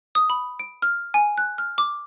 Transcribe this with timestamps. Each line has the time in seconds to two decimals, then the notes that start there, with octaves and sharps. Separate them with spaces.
0.15 D#6
0.30 B5
0.59 D7
0.82 F6
1.14 G#5
1.38 F#6
1.58 F6
1.78 D6